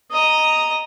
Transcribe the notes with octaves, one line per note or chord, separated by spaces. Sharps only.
D#5 A#5